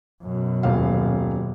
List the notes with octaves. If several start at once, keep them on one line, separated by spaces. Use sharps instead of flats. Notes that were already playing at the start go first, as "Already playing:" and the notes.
F#2 B2
D#1 F5